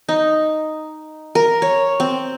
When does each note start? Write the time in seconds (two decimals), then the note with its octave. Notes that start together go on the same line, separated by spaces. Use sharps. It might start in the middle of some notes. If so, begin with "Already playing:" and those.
0.09 D#4
1.35 A#4
1.62 C#5
2.00 C4